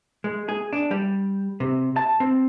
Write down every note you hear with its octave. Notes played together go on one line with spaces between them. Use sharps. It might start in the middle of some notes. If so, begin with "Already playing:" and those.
G#3
G#4
D4
G3
C3
A5
C4